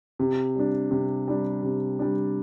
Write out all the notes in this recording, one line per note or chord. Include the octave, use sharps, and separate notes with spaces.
C3
G3 D4
C3
G3 D4
C3
G3 D4